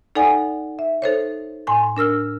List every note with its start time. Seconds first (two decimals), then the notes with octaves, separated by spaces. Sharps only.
0.15 D#4 A4 D5 F#5 G#5
0.79 E5
1.02 D#4 A4 C5 C#5
1.67 A2 G#5 C6
1.97 D4 A#4 E6 F6